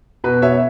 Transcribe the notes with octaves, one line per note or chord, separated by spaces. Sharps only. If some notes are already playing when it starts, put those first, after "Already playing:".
B2 B4
B2 C#5 E5